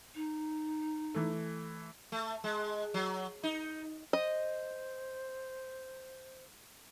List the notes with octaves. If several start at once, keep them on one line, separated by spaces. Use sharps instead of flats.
D#4
E3 A3
A3
G#3
F#3
D#4
C5 D#5